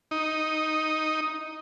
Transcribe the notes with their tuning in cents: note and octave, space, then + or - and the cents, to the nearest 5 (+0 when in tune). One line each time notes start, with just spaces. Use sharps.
D#4 +0